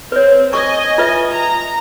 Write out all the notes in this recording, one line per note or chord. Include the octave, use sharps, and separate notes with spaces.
C4 B4 C#5
D#5 G#5 C#6
F4 B4 E5
A#5